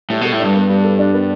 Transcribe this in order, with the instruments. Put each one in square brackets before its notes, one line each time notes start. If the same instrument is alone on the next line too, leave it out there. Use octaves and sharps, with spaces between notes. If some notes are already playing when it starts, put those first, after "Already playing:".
[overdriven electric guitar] A2 [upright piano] G3
[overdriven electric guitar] B2 [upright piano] A4
[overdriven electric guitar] A2
[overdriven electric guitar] G2 [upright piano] D4
[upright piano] B3
G3
A4
D4
B3